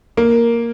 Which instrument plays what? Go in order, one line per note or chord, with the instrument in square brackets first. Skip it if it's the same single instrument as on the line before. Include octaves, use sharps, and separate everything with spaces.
[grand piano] A#3